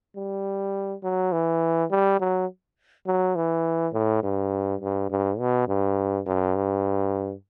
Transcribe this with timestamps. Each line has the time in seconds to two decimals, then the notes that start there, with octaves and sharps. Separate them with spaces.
0.16 G3
1.03 F#3
1.32 E3
1.91 G3
2.20 F#3
3.07 F#3
3.36 E3
3.93 A2
4.23 G2
4.81 G2
5.10 G2
5.39 B2
5.68 G2
6.26 F#2
6.55 G2